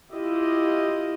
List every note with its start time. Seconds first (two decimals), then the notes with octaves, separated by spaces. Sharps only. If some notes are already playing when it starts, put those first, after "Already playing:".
0.13 E4 F4 G4 D#5